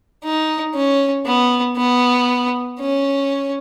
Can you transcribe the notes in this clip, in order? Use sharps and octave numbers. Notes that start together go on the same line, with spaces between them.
D#4
C#4
B3
B3
C#4